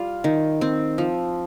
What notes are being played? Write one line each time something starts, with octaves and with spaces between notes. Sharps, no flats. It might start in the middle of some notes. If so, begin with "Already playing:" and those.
Already playing: G3 F4
D#3
C4
F3